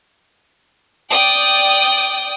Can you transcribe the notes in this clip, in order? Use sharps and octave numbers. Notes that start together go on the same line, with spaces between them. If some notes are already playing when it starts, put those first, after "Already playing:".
D5 G5 D#6